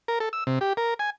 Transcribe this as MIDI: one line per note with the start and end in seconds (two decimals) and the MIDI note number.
0.08 0.19 70
0.20 0.29 69
0.33 0.44 88
0.47 0.59 48
0.61 0.73 67
0.77 0.94 70
0.99 1.10 80